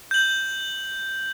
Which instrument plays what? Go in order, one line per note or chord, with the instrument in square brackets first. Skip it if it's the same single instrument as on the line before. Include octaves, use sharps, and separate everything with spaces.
[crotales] G6 F#7